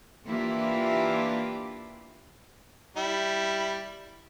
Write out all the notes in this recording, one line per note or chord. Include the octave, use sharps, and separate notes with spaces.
E3 A#3 D4 E4 F4 G4
G3 E4